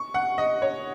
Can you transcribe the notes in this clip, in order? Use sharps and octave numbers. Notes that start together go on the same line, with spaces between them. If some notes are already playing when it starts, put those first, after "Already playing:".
Already playing: C#6
F#5
D#5
C#5